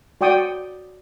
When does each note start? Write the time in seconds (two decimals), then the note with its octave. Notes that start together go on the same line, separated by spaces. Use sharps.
0.21 F#4 D5 G5 C#6 D#6